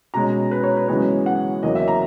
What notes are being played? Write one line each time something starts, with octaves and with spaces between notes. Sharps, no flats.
B2 G#3 C#4 A#5
B4
C#5
B4
F#2 C#3 E3 G#3 B3 C#5
F#5
E2 C#3 F#3 A#3 C#4 D#5
E5
A#5